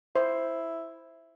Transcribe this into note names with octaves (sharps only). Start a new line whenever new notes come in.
E4 C5